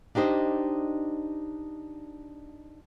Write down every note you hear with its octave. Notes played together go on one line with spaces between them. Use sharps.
D4 D#4 G4 C5 D#5